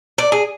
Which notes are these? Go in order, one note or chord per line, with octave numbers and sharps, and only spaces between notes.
D5
G#4